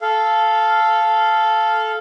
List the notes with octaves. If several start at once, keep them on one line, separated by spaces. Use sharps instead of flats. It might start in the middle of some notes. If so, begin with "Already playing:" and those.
A4 F5